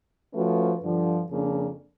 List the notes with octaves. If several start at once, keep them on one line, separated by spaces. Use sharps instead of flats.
F3 A3 C#4 F#4 B4
G2 D3 F3
F2 C#3 F3 A#3 D4